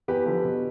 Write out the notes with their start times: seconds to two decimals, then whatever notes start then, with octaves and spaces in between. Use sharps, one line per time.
0.08 E2 G4 B4
0.26 D3 F3
0.44 B2